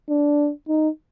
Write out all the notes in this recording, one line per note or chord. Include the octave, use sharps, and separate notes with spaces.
D4
D#4